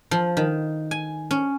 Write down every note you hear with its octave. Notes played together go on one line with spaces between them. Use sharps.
F3
D#3
G#5
C#4